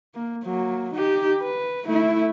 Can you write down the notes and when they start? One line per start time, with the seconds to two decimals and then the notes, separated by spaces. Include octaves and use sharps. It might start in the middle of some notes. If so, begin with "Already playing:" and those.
0.15 A#3
0.44 F#3 A#3
0.94 D#4 G4
1.41 B4
1.85 A3 E4